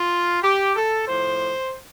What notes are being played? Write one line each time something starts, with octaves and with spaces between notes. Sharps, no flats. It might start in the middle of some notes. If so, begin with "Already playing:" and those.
Already playing: F4
G4
A4
A2 F3 C5